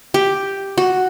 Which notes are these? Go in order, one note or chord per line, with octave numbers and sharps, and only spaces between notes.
G4
F#4